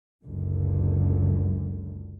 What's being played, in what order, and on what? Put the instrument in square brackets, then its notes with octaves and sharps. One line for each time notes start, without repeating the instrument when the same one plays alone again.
[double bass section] F#1 C#2 F#2 D3